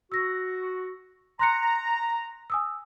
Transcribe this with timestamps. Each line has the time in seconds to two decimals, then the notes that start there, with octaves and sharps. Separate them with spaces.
0.12 F#4 E6 A#6
1.39 A#5 C6 F#6 C#7
2.50 G#5 D#6 E6